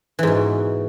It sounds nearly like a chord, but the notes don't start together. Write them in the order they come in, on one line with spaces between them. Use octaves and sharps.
E3 G#2 B2